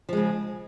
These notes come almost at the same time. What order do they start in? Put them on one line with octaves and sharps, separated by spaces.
F3 G#3 C#3